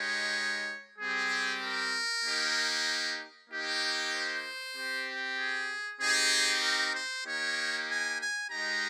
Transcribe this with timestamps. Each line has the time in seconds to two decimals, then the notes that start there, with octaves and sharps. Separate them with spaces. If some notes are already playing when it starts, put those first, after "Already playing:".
Already playing: G#3 D#4 G4 C#5
0.99 G3 C4 G4 G#4
1.62 A#4
2.25 A#3 D#4 G4
3.50 A#3 D#4 G4
4.12 C5
4.76 C4 G4
5.38 G#4
6.00 C4 D#4 G4 G#4
6.63 A#4
6.94 C5
7.26 A#3 D#4 G4 C#5
7.89 G#5
8.20 G#5
8.51 G#3 D#4 G4 A#5